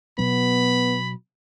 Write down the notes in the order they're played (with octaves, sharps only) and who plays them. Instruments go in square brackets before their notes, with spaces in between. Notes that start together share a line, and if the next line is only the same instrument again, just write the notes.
[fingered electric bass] B2 F#3 [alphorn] B3 [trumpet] B5